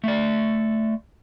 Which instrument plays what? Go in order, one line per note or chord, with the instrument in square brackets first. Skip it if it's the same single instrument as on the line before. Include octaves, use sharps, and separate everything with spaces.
[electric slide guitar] A3 D5